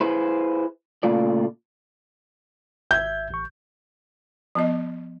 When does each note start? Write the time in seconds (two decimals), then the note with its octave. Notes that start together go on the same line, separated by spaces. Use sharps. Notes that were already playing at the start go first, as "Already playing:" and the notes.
0.01 E4 G#4 B4 C5
1.03 A#2 C#3 A3 F4 D5
2.91 G#1 E5 G6 G#6
3.30 A1 C#6
4.55 F3 B3 D#5